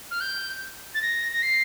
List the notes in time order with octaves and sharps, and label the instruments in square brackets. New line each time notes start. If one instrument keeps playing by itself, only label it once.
[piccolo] F6
G6
A6
A#6
A#6
C7